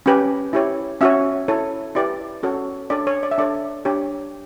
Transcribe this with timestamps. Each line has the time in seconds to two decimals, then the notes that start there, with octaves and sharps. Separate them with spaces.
0.06 C#4 G4 B4
0.53 E4 G4 C#5
1.01 C#4 F#4 C#5 E5
1.48 E4 A4 C#5
1.95 E4 G4 B4 D5
2.43 C#4 F#4 A4 C#5
2.90 D4 A4 C#5 D5
3.07 C#5
3.23 D5
3.31 E5
3.38 D4 A4 C#5 D5
3.85 D4 G4 C#5